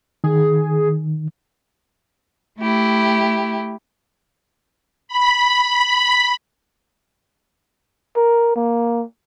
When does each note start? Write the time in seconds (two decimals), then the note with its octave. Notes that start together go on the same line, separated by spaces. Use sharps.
0.24 D#3 G#4
2.58 A3 E4 G4
5.08 B5
8.16 A#4
8.56 A#3